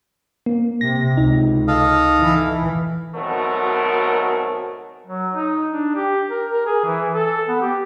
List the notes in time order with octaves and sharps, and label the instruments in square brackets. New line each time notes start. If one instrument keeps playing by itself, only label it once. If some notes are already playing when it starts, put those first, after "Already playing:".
[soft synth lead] A#3
[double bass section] C3 [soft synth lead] A#6
[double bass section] C#2 [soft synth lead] D#4
[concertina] A4 D#5 F5
[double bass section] E3
[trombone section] G#1 B2 F#3 A3 A#4
[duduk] F#3
D#4
D4
G4
A#4
A#4
G#4
E3
A4
B3
G4